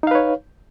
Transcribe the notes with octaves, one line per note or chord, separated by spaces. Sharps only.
D#4 B4 C#5 F5